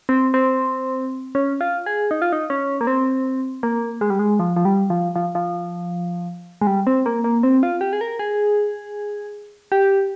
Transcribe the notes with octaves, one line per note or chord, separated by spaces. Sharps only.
C4
C4
C#4
F4
G#4
D#4
F4
D#4
C#4
A#3
C4
A#3
G#3
G3
G#3
F3
F3
G3
F3
F3
F3
G#3
G3
C4
A#3
A#3
C4
F4
G4
G#4
A#4
G#4
G4